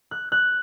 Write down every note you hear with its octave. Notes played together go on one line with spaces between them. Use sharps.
F#6
F#6